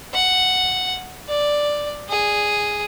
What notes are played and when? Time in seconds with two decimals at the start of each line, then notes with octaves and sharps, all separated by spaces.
0.14 F#5
1.29 D5
2.10 G#4